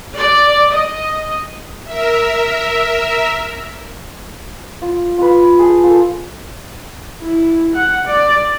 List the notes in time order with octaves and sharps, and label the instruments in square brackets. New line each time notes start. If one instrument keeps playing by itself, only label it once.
[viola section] D5
D#5
[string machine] A#4 E5
[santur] F4
F4 B4
G#4 A5
F4 A4
[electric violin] E4
F#5
D5